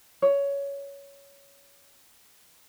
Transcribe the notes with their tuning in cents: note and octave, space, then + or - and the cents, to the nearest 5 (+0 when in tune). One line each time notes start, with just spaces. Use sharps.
C#5 +15